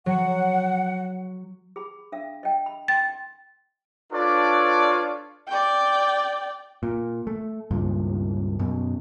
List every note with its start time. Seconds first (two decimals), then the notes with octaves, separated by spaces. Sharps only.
0.06 F#3 F#5
1.76 G#4 B5
2.12 D4 E5 F5
2.43 D#5 G5
2.66 B5
2.88 G5 C6 A6
4.12 D4 F4 A4 B4 C#5 D5
5.48 D5 G5
6.83 A#2
7.27 A3
7.71 C#2 G2 A#2
8.59 F#2 B2